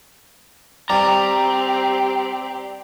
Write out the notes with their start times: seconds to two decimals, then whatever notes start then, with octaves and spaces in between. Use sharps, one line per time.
0.90 G3 C4 G4 D5 A#5